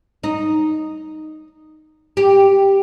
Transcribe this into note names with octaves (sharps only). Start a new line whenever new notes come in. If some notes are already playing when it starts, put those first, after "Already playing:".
D#4
G4